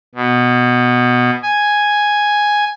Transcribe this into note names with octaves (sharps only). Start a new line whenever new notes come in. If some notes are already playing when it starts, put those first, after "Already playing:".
B2
G#5